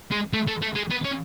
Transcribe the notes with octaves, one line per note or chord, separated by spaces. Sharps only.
G#3
A3
A3
A3
G#3
B3
C#4